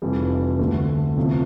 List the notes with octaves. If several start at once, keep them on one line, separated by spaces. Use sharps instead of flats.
F1 F2 E3 G3
D2 D3 A3
E2 C3 F3 A3